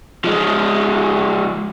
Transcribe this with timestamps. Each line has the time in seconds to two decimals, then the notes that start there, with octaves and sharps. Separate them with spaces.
0.25 F3 G#3